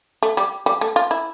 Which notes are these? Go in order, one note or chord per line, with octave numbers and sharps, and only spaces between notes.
A3
G3
G3
A3
F4
E4